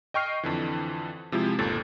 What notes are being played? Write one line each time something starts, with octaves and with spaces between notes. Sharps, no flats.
D#5 G5 C#6 F6 C7
F2 D3 E3
C3 F3 G#3 E4
G1 D#2 A#2 A4 A6